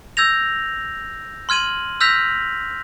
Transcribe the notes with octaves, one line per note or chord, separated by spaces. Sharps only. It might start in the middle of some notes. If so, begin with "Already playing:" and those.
E6 G6 G#6 A#6 F7
C6 F6 G#6 D#7 F#7
E6 F6 G6 A#6 B6 F7